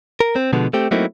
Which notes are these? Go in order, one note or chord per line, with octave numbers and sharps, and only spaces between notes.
A#4
C4
B2 D3 F3 G#3 B3
A3 C4 G4
F#3 A3 A#3 C4 D#4 E4